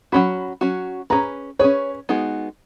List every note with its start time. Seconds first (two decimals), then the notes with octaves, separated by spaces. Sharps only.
0.12 F#3 C#4 F#4 B5
0.61 F#3 C#4 F#4
1.10 C#4 G#4 B4 A#5
1.59 C#4 G#4 B4 C#5
2.09 G#3 B3 D#4 F#4